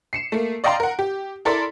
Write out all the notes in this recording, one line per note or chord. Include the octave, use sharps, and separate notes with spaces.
C7 C#7 E7
A3 A#3
D5 D#5 F5 G5 A#5 C6
A#4 F#5
G4
E4 A4 A#4 D5 C6